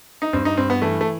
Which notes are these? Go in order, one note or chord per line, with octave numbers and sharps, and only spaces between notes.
D#4
G2 C4
D#4
G2 C4
B3
E3 A3
A3